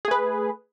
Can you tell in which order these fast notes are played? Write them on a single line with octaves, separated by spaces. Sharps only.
G#4 A3 B4